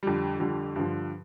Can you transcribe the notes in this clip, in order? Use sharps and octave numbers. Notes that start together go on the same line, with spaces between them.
F2 D3 G3
F2 D3 G3
G2 D3 F3